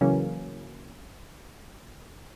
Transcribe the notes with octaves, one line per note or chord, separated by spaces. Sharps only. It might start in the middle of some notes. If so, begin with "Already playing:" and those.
C#3 E3 F#3 A#3 C#4